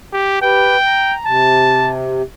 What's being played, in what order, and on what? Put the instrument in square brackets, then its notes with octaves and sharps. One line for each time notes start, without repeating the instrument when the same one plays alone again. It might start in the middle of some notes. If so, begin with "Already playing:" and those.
[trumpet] G4
[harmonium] G4 B4 [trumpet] G5
[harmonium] A#5
[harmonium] C3 [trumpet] A5